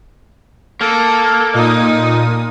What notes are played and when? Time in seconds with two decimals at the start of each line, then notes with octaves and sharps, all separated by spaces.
0.81 A#3 A4
1.54 A#2 D#4 D#6